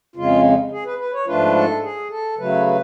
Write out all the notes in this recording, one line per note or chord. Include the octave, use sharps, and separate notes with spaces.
F2 C#3 G#3 F4
G#4
B4
B4
C#5
G#2 F3 A3 D4 F4 B4
A4
G#4
A4
C#3 F#3 A3 B4
B4